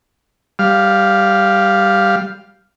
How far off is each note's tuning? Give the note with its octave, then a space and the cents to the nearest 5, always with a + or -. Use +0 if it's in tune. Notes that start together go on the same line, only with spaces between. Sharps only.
G3 +0 F5 +0